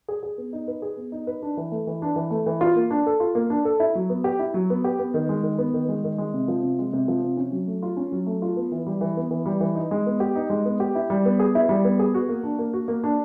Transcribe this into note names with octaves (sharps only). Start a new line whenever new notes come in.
G#4
G#4
B3
D#4
B4
G#4
B3
D#4
B4
D4
E3
A3
E3
D4
E3
A3
E3
F4
A#3
D4
A4
F4
A#3
D4
A4
E4
F#3
B3
G4
E4
F#3
B3
G4
B3
D#3
G#3
D#3
B3
D#3
G#3
D#3
G#3
C3
F3
C3
G#3
C3
F3
C3
C#4
F#3
A3
F4
C#4
F#3
A3
F4
B3
E3
G3
E3
B3
E3
G3
E3
D#4
G#3
B3
G4
D#4
G#3
B3
G4
E4
G3
B3
G#4
E4
G3
B3
G#4
F#4
A#3
D4
A#3
F#4
A#3
D4